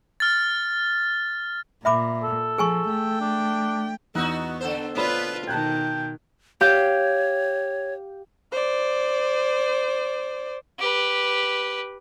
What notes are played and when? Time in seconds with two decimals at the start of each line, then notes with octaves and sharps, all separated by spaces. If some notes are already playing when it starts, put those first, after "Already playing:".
0.20 F6 A6
1.85 A#2 E5 B5 D6
2.23 A4
2.58 F3 G#4 G#5 C#6
2.89 A3 G5
3.21 D4
4.15 E2 B3 D#4 F#4 E6 F#6
4.61 D3 A4 C5
4.95 B3 F4 B4 C#5 D5 B5
5.47 B2 D#3 G5 A5 F#6 G#6
6.61 G4 C#5 F5 G6
8.52 C5 D5
10.79 G4 B4